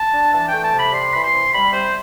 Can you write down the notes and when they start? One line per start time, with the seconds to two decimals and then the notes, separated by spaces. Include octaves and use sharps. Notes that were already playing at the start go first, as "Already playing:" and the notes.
Already playing: A5
0.12 D4
0.32 E3 A5
0.48 A3 G5
0.63 A5
0.73 C3
0.78 B5
0.93 G3 C6
1.11 E3 B5
1.23 C6
1.33 C3
1.53 G3 B5
1.73 C3 C5